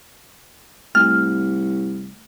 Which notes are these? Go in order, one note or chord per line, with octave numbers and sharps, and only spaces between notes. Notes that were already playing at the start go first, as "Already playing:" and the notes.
C2 A3 F6